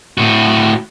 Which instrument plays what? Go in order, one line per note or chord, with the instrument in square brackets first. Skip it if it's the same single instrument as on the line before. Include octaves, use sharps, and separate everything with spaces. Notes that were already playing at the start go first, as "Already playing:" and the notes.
[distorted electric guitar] A2 F#4